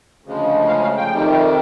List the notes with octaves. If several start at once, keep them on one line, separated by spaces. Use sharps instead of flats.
D2 C#3 F3 G#3
F5
F5
G5
F2 C3 D#3 G3